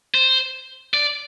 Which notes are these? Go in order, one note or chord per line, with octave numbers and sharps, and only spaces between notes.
C5
D5